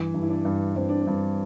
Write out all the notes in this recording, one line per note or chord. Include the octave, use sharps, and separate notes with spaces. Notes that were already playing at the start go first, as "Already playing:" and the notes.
Already playing: G2 E3
G2
E4
D4
G2
G2 C4
D4
C4
G2